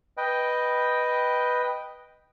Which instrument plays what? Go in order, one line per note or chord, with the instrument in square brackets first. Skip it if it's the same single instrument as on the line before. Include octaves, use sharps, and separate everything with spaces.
[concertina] B4 D#5 G5